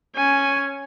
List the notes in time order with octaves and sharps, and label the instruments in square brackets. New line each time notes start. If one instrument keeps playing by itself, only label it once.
[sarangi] C#4 [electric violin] G#5